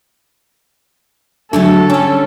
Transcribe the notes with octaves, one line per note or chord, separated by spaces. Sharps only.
D3 F#3 G#3 A3 D4 A4
D3 G3 C#4 G#5